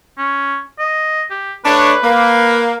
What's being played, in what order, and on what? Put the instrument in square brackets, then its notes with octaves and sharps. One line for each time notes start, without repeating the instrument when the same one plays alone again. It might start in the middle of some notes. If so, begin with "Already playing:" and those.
[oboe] C#4
D#5
G4
[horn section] A3 D4 C#5 [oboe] B4
[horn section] A#3